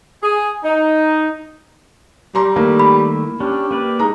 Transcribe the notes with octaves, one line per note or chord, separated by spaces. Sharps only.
G#4
D#4
G3 A#5 C6
D#3 A3 A#3 E4
B5
C#4 D4 G4
A#3 B4 D5
G#3 D#4 A#5